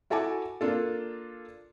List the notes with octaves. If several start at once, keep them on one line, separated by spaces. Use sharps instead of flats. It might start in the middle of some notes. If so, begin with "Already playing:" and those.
E4 F#4 A4 G#5 A5 D6
A#3 D4 F4 A4